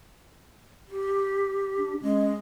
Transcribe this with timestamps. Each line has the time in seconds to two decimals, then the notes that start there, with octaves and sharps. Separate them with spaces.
0.88 G4
1.78 D4
2.02 G#3 C#4